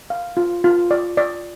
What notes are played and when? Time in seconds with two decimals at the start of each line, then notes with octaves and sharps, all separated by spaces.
0.10 F5
0.37 F4
0.64 F4
0.91 D5
1.17 D5